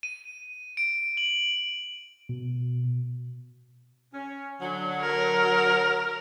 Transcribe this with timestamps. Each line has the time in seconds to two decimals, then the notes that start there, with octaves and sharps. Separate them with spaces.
0.03 D#7
0.77 D7
1.17 F#7
2.29 B2
4.12 C#4
4.60 D3 F#3
5.00 A#4